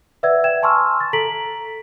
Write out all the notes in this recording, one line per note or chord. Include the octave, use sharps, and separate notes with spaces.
B4 D5 E5 F#5 E6 G#6
E5 G5 G#6 E7
G#5 A5 C6 C#6 E6 F6
A6
A4 A#5 B6 D7 F#7